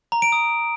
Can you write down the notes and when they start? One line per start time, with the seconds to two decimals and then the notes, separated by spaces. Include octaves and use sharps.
0.12 A#5
0.22 D7
0.32 D#6